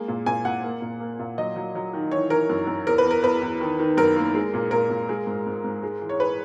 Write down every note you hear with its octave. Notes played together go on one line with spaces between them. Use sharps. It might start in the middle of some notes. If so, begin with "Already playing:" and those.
Already playing: G#3 A#3
A#2
A#2 G#5
A#2 F#5
A#3
A#2
A#3
A#2
F#3 D#5
F#3
F#3
D#3
E3 C#5
E3 A#4
F#2
F#2
E2 A#4
B4
E2
A#4
E2 B4
E2
D#3
D#3
F#2 A#4
A#3
G#3
A#2
A#2 A#4
A#2
G#3
G#2
G#2
G#2
G#3
E3
C#5
G#3 B4